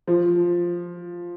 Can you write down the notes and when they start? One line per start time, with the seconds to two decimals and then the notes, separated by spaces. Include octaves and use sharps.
0.08 F3